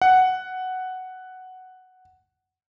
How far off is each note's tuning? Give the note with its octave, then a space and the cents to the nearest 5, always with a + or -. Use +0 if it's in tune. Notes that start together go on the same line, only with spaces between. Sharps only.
F#5 +5